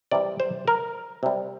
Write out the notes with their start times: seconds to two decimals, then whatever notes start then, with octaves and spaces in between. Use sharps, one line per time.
0.11 C3 E3 G3 D5
0.40 C5
0.68 A#4
1.23 C3 G3